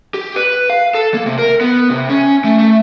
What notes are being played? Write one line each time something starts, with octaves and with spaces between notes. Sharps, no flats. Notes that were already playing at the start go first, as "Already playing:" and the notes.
G4
B4
F5
A4
A#3
C3
A#4
B3
C3
C#4
A3
A3